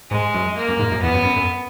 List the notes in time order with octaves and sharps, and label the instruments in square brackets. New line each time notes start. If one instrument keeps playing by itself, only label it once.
[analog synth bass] G#2 [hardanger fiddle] G#3
[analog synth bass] F#2
[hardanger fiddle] A#3
[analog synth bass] F#2
G#2
F#2
[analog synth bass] E2 [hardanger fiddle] B3
[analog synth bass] F#2
F#2
F#2